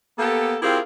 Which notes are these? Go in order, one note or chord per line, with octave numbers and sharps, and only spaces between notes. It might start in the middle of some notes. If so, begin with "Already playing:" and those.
A#3 B3 G4 A4
C4 E4 F4 G4 G#4 A#4